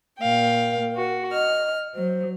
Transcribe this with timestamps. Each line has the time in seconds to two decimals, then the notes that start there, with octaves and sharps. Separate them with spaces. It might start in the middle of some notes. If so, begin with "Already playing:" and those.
0.20 A#2 A#4 F5 G5
0.95 F#4
1.32 D#5 F6
1.94 F#3 C5